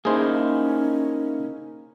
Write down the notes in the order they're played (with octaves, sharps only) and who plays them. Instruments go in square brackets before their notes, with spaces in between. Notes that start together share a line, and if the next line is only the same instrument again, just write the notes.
[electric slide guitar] A#3 D#4 E4 [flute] C#4 [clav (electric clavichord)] G#4 C5